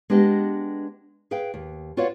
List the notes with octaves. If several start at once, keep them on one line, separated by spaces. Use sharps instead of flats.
G#3 B3 D4 G4 B4 D#5
G#4 B4 F5 G5
D#2
F4 F#4 B4 C#5 D5 F5